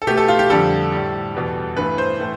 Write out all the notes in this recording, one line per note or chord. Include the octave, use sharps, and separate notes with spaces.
A4
B2 A3 G4
A4
F4
G4
F2 D3 G3 A4
A2 G3
E2 B2 G3
G2 E3 A3 B4
C5
A2 E3 A3